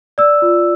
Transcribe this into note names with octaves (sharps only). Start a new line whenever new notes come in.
D5 E6
F4